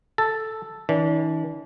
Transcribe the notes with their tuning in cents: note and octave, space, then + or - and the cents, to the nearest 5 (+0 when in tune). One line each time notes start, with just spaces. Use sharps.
A4 +0 A5 +5
E3 -45 D4 -30